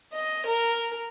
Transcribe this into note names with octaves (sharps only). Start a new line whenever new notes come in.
D#5
A#4